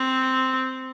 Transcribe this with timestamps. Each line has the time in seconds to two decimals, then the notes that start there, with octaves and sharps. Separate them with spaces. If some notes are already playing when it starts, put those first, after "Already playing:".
Already playing: C4